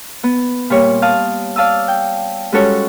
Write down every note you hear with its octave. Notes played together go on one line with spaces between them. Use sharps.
B3
A#2 G3 C#5
F5 A5 D#6
D5 F5 A5 D#6 E6
G5
G3 G#3 C#4 F#4 A4 C#5